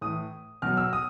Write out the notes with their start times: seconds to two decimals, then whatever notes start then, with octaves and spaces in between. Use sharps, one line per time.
0.01 A2 E3 D#6
0.62 B2 F#3 F6
0.77 E6
0.93 D#6